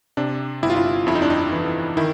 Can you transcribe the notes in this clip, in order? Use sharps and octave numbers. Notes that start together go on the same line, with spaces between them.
C3 D4
G1 E4
F4
E4
F2 E4
D#4
D4
D#4
E3
D#3 E4